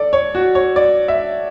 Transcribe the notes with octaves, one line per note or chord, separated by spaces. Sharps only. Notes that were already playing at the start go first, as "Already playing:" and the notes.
Already playing: A4 D5
C#5
F#4
C#5
D5
E5